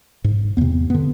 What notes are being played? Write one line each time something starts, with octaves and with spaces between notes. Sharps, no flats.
G#2
E2 C3 B3
B3
D3